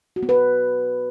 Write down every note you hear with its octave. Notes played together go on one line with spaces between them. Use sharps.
F#4
B3
B4